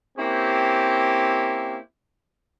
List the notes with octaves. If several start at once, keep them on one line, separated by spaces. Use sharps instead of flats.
A#3 C4 C#4 E4 G4